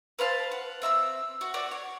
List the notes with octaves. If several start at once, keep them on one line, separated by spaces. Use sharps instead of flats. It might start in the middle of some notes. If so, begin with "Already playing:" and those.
B4 C5 F5 A5
F#5
C4 E5 B5 E6
F#4
F#4 D5
C#5